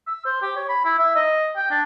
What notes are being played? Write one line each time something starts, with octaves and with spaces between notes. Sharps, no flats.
E6
C5
G4
C#5
B5
E4
E5
D#5
G5
D4